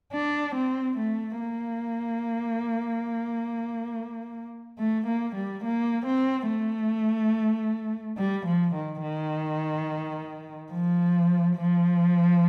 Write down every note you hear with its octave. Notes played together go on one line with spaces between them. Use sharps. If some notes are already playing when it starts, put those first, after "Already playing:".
D4
C4
A3
A#3
A3
A#3
G3
A#3
C4
A3
G3
F3
D#3
D#3
F3
F3